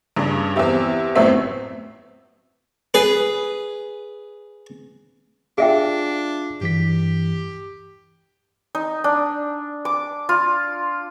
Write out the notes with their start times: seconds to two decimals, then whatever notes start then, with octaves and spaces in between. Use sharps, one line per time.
0.17 G2 C#3 D4
0.56 E2 C4 E4 G4
1.15 G1 F#2 A2 B3 C4 E5
2.94 G#4 B4
5.58 D4 F4 G#4 E5 F5 G5
6.61 G2 E3 G4 B6
8.75 D#4
9.04 D4
9.85 D6
10.29 F4